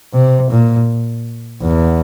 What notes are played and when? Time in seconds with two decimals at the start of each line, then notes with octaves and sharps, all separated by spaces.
0.13 C3
0.51 A#2
1.61 E2